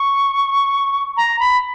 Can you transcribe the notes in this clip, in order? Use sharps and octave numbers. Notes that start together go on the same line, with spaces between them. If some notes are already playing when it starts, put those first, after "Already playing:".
Already playing: C#6
A#5
B5